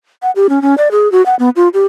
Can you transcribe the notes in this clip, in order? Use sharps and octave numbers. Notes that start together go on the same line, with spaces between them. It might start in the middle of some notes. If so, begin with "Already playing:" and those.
F#5
G4
C#4
C#4
D5
G#4
F#4
F#5
B3
F4
G4